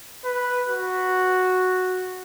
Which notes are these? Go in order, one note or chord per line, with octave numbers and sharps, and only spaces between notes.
B4
F#4